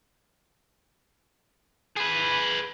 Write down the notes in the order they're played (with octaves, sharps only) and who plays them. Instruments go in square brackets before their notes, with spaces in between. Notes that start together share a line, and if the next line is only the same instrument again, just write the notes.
[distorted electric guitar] G#4 B4